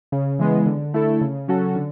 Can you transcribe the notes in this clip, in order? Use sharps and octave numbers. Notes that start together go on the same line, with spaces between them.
C#3
E3 G#3 B3
D3
A3 E4 A4
C#3
F#3 C#4 F#4 A4
D3